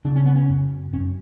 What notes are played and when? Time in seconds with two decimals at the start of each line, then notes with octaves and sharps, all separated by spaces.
0.05 C#3 D4
0.16 C#4
0.25 B3
0.35 C#4
0.49 F#2
0.93 F#2 C#4